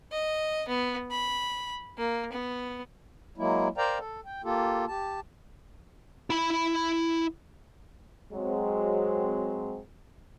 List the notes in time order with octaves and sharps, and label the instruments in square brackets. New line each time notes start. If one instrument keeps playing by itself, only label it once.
[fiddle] D#5
B3
B5
A#3
B3
[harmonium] F#3 G#3 A#3 E4
A#4 C5 D5 F5 G5 A#5
A4
G5
A#3 F4 G4 A4
G4 A5
[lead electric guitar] E4 B5
[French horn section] F#3 G#3 C4